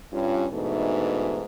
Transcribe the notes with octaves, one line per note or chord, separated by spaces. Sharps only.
G2 C#4 F4
G#2 B2 E3 A3 D4 D#4